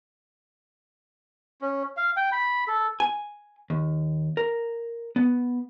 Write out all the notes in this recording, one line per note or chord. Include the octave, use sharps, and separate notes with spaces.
C#4
F5
G5
B5
A4
G#5
D#2
A#4
B3